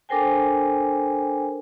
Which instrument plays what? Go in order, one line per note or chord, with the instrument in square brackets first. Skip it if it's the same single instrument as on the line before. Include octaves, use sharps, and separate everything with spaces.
[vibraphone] D4 A4 A#4 C5 G5 G#5